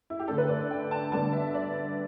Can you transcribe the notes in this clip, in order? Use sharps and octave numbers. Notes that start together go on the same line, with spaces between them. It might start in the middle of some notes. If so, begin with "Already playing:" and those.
E4
G4
D3 A3 D4 A4
B4
D5
G5
A5
D3 G3 B3 D4 A5
E5
D5